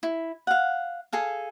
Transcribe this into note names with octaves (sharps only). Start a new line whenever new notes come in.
E4
F5 F#5
G#4 A4 F5